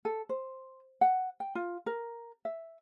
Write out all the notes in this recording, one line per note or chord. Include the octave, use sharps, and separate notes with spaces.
A4
C5
F#5
G5
F4
A#4
E5